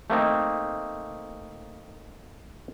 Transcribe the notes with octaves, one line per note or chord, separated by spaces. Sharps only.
A3 A#3 C4 D#4